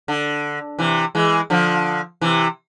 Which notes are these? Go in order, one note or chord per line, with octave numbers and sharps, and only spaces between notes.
D3
C3 E3
E3 G#3
D3 F3
C3 E3